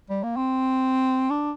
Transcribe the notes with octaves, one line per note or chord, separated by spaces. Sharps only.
G3
A#3
C4
D4